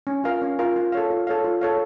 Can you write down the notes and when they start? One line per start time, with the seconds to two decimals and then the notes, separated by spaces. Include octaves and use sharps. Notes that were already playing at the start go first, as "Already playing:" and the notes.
0.07 C#4
0.24 F4 A#4 F5
0.42 C#4
0.59 F4 A#4 F5
0.76 F4
0.92 A4 C#5 F5
1.10 F4
1.27 A4 C#5 F5
1.44 F4
1.61 A4 C#5 F5